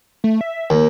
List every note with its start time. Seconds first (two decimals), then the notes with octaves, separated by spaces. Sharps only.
0.24 A3
0.41 E5
0.70 D#2 D#3